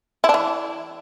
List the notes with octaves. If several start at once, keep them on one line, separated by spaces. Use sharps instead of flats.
E4
D4
E3